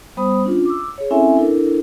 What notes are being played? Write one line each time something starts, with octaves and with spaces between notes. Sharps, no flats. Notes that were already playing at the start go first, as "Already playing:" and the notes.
G3 B3 C5 B5 D#6
C#4 D4 F4
D6 E6
G#4 C#5
C4 C#4 E4 A4 E5 G#5
D4 E4 A4 A#4